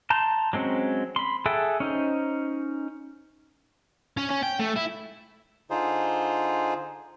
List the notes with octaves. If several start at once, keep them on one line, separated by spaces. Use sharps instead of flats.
A5 A#5 C6 G6
F#3 G#3 C4 C#4
B5 C6
G#4 A4 E5 F#5 G5
C#4 D#4 C5
C#4
C#4
G5
A3
E4
D3 D#4 F4 G#4 C5